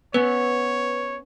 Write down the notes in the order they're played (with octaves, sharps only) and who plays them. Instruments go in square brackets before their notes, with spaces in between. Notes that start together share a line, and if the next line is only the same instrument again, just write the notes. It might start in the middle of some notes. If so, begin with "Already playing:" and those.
[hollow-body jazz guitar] B3 C#4 [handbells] B4 [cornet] C#5